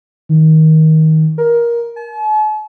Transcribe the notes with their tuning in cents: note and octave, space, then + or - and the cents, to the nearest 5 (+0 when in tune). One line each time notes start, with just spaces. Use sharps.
D#3 +20
A#4 +15
A5 -45